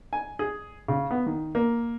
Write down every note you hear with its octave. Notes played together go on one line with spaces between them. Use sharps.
G#5
G#4
C#3
B3
D#3
A#3